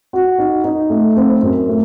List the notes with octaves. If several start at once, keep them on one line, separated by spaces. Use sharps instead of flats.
F#4
D#4
D#4
A3
C4
F#2
A3